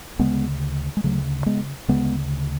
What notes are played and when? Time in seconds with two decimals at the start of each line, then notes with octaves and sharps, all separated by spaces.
0.19 D2 C#3 G#3 B3
0.97 G#3
1.04 D2 C#3 F#3 A3
1.46 G#3 B3
1.88 D2 C#3 G#3 B3